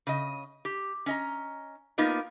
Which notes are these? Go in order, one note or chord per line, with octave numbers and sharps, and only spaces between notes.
C#3 D#5
G4
C#4 D#5 A#5
A#3 B3 D#4 F4 A#4